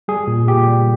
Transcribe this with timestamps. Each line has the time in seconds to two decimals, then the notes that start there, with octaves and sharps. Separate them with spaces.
0.08 G3 G#4
0.27 A#2
0.47 A#2 G4
0.67 G3